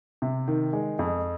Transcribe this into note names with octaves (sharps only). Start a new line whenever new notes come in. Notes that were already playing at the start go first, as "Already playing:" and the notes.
C3
D#3
G#3
F2